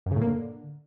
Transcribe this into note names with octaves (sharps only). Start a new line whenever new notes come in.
F#2
C#3
A2
A#3
D3